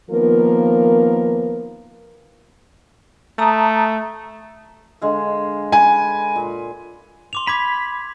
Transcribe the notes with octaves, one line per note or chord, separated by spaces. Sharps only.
D#3 F3 A#3 B3 A#4
A3 A5 A#5 D#6
D3 G#3 F5
B4 G#5
A#2
C6 D6 F7
B5 D6 G#6 B6